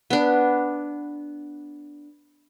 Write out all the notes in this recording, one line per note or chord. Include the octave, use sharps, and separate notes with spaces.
B3 D4